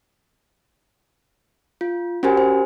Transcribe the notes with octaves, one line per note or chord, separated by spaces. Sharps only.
F4
C#4 F#4 G4 A#4 C5 G#5
C5